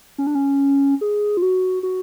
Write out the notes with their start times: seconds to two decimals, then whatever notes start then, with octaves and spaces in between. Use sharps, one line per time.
0.18 C#4
0.27 D4
0.35 C#4
1.01 G#4
1.37 F4
1.42 F#4
1.83 F#4